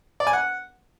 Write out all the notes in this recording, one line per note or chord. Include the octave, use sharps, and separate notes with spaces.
D5
G#5
F#5